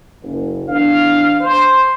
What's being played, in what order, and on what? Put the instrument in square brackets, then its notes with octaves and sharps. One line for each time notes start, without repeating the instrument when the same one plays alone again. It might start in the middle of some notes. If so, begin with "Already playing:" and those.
[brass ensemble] F#1
[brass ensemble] E2 D4 [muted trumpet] F5
[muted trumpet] C5